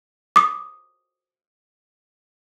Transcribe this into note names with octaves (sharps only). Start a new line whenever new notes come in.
D6 D#6